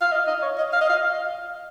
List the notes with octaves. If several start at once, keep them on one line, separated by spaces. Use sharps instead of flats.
F5
D#5
D#5
C#5
D#5
F5
D#5
F5